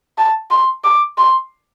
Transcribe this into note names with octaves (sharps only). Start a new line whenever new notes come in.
A5
C6
D6
C6